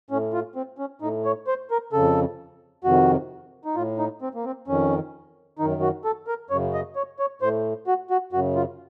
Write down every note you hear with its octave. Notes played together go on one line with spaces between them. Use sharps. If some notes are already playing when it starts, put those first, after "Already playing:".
A2 C#4
F4
C4
C#4
A2 D#4
C#5
C5
A#4
F2 C#3 A4
F2 C3 D#3 F#4
D#4
A2 F4
D#4
C4
A#3
C4
F2 D#3 C#4
F#2 D#3 D#4
F#4
A4
A#4
F#2 C#3 C#5
D#5
C#5
C#5
A2 C5
F#4
F#4
F#2 C#3 F#4
F4